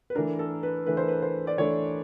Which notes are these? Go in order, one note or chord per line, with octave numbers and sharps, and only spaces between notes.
B4
E3 A3 D4 A#4
A4
B4
E3 A3 D4 B4
C5
B4
C5
D5
E3 A3 D4 C#5